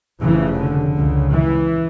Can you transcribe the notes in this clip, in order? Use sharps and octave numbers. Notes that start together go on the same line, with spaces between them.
F1 F2 C#3 E3
D3
C#2 C#3
E3